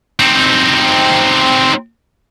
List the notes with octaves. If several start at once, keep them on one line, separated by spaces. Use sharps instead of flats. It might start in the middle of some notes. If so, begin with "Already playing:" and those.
C4 D#4